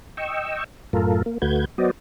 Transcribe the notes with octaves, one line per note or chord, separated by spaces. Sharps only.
D#5 G5 C#6 E6
F#2 A2 F4 A4 A#4
A#3
D2 A3 F#4 B4 G6 G#6
F#3 B3 F#4 C5 D5 D#5